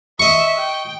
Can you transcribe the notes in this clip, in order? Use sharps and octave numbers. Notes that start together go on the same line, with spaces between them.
D#5 E5 C#6
G5